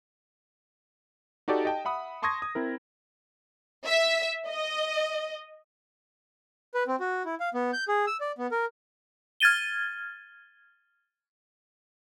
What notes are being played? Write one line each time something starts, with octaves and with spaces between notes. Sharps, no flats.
D#4 F#4 G4 A4 D5
D#5 G5 A5
E5 F#5 B5 D#6
A5 C6 C#6 D#6 G#6 A#6
D#6
C4 E4 A#4
E5
D#5
B4
C4
F#4
E4
F5
B3
G6
G#4
E6
D5
B3
A#4
F6 G#6 A6 D#7 G7